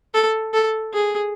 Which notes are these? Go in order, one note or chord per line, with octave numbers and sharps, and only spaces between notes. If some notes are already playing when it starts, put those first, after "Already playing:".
A4
A4
G#4